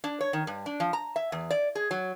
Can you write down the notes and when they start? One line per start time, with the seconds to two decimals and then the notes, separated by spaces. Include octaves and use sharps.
0.04 D4
0.21 C#5
0.33 D#3
0.47 G2
0.66 D4
0.80 F3
0.93 A#5
1.16 E5
1.32 E2
1.51 D5
1.75 G#4
1.91 F#3